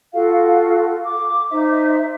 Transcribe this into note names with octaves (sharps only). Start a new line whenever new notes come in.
F4 F#4 A4 F5
D6
D#4 C5 E5